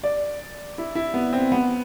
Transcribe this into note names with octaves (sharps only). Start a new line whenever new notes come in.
D5
E4
E4
B3
C4
B3